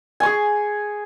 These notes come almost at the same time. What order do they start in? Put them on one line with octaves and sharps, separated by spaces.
G#5 C#6 G#4